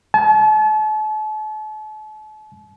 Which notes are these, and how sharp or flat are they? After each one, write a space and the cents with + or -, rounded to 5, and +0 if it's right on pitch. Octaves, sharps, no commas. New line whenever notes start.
A5 -40